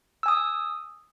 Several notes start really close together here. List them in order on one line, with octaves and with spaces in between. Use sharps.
E6 G#5 D#6